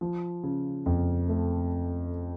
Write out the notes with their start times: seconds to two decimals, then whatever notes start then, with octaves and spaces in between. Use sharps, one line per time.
0.01 F3
0.43 C#3
0.86 F2
1.29 A3